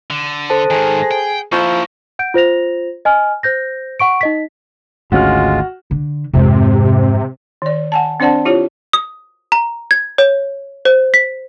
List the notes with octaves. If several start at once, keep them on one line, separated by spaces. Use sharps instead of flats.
D3
A4 C5 A5
G#2 D#3 G#4
G5
F3 A#3 E4 C#6
F#5 G6 D7
F4 C5 A#6 F7
D#5 G#5 F6
C5 G6 A#6
F#5 C#6 D7
D#4 D#5 B6
G#1 D2 G#3 C#4 F4 F#4 F6
D3
F2 G#2 C3
D#3 D5
F#5 G#5 A5
C4 D4 C5 D5 F#5 A5
E4 F4 G4 C#5
D#6
A#5
G#6
C#5
C5
B6